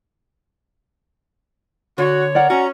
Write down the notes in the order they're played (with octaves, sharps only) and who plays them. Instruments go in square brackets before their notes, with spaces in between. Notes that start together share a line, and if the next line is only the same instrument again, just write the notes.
[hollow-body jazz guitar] D3 [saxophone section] F#4 [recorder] C#5
[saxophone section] A#4 [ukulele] D5 F#5
[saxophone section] C#4 [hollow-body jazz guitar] F#4 [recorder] A#5